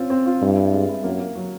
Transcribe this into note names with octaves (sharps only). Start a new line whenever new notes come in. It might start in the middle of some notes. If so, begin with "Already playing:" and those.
Already playing: C4 C#4 F4
C4
F4
G2 E4
E4
G#3
E4
F#2 A#3
A#3
F#3